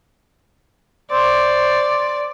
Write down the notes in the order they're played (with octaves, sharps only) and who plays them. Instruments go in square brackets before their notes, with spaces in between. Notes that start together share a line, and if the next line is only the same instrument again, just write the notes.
[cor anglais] C5 [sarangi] D5